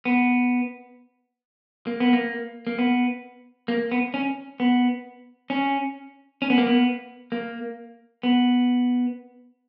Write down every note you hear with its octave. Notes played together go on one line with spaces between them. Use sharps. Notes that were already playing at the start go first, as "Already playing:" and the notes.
B3
A#3
B3
A#3
A#3
B3
A#3
B3
C#4
B3
C#4
C#4
B3
A#3
B3
A#3
B3